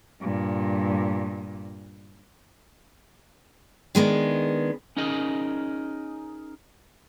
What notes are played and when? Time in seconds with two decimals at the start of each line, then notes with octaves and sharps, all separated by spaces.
0.21 G2 A#2
3.95 D#3 G#3 B3 D4
4.97 C#4 D#4 G#4 A#4 D#5